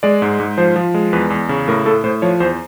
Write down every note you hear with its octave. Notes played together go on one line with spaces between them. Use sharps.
G#3 D5
G#2
G#2
F3 C5
F3
G#3
E2 B4
E2
C#3
A2 A#4
A2 A4
A2 C5
F3 C#5
E2 C5